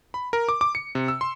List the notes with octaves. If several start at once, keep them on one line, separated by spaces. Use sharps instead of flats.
B5
A#4
D6
D6
C#7
C3
E6
C6